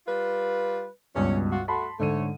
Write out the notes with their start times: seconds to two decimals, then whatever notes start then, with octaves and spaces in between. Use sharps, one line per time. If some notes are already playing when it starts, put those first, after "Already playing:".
0.07 G3 F4 B4
1.15 C#2 G2 B2 C#4
1.52 F4 F#4
1.68 A3 F#4 A5 B5 C6
1.99 G#2 D3 A3 C#5 D#7